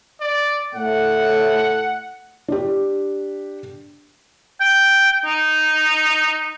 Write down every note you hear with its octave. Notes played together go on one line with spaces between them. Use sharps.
D5
A2 A3 F#5
D4 G4
G5
D#4